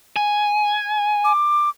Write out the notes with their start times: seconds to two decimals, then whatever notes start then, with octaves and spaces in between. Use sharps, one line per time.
0.16 G#5
1.24 D6